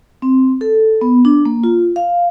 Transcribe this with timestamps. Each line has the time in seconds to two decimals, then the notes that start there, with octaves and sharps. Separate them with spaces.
0.22 C4
0.61 A4
1.01 B3
1.25 D4
1.45 A#3
1.64 F4
1.96 F5